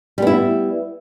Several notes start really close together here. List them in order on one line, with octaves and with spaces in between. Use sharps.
G3 B3 E4